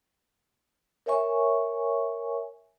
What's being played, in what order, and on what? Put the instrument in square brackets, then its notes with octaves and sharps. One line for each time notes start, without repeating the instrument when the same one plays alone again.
[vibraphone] A#4 C#5 E5 G#5 C#6